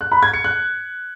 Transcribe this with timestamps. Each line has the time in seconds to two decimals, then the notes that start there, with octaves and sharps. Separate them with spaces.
0.01 F#6
0.12 B5
0.23 G#6
0.33 C#7
0.44 F#6